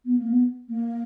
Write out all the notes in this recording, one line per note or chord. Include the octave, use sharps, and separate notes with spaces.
B3
A#3
B3
A#3